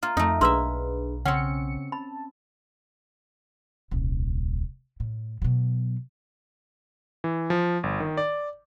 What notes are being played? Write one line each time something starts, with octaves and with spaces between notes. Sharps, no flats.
A#3 F4
F2 A3 D#4
B1 A#3 D4 G#4 B4 E5 C6 E6
C#3 C4 C#4 F#5 C#7
A5 B5
D#1 C2
A2
B2 F#3
E3
F3
G1
D#3
D5